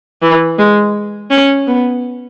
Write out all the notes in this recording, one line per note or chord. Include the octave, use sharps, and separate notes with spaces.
E3
G#3
C#4
B3